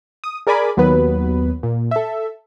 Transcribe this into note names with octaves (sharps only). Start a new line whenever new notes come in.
D#6
G#4 A#4 D5 G#5 B5 D6
D#2 F#3 B3 B4
A#2
A4 E5